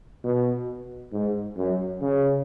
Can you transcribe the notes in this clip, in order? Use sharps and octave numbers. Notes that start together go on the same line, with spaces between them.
B2
G#2
F#2
C#3